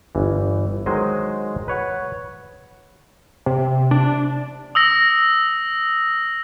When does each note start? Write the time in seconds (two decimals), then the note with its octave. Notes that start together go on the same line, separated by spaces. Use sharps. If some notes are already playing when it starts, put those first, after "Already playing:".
0.15 G1 E3
0.86 D#3 F#3 G#3 G#4 C5 D#5
1.68 B4 C#5 F#5
3.46 C3
3.91 D4
4.75 D#6 E6 A#6